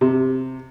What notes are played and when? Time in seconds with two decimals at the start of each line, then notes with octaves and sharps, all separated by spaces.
0.01 C3